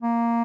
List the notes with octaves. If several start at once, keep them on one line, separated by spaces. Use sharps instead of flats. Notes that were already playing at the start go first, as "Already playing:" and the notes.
A#3